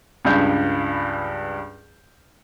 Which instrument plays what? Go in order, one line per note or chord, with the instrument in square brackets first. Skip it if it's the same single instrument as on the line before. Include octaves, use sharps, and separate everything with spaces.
[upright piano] C#2 G2 G6